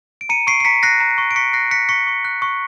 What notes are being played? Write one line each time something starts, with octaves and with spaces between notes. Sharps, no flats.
D7
A#5 C#7 D#7
C#6 C7 D7
C7
A#5 B6 C#7
F#6 A#6 C7
A#5
C#6
D7
C#6 B6 C#7
F#6 A#6 C7
F#6 B6 C#7
C#6 B6 C#7
C#6
F#6
C#6